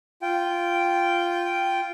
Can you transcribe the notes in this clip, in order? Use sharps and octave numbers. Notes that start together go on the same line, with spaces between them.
F4 G5